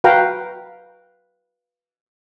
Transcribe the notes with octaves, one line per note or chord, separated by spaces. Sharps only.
F#4 B4 F5 G5 A#5